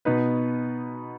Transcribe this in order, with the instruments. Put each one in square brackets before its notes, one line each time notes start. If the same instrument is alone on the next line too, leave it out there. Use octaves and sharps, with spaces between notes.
[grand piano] B2 B3 D#4 B4